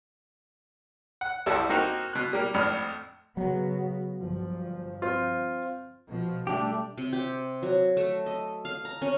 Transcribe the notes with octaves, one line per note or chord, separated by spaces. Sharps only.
F#5
C2 G3 E4 A4 A5
A#3 C4 D#4 F#4 G4
B2 F#6
G3 A#3
G#1 F2 A2 D4 B5 F6
C#3 F#3 B3
G1 F3
C4 F4
B2 F3
G3 A3 D4 G4
C3
G4
F#3
A3
D#5
F5
A#5
C#4